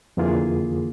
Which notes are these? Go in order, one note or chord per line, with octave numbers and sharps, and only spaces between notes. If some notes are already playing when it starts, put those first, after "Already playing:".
F2 D3 E3 A#3 F4 G#4